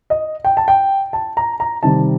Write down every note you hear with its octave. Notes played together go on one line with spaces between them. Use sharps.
D#5
G5
A5
G5
A5
A#5
A#5
C3 D#3 G3 A5